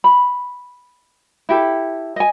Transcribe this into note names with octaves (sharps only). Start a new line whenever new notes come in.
B5
E4 G4 A4
D#5 G#5